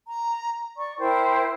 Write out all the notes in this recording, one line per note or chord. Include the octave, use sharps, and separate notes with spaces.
A#5
D5 C#6
E4 A#4 C5 G5